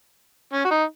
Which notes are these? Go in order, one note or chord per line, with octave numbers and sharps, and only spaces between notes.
C#4
F#4
D#4